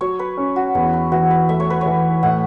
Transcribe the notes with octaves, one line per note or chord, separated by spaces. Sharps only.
F#3 C#5
B4
C#4
F#4
E2 E4
E4
E3 F#4
B4
A3 E5
C#5
B4
E3 C#5
A2 F#5